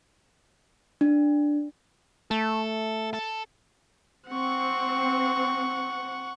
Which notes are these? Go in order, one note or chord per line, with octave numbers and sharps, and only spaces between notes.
D4
A3 A4
A4
C4 F#5 C#6